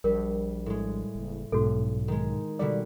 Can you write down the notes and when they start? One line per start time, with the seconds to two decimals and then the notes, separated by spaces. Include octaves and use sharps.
0.04 A#1 G3 A#4
0.66 A2 G#3
1.15 F#1
1.52 B1 G#2 B2 F#4 A4
2.08 D#3 G#3
2.59 B2 D3 G3 D5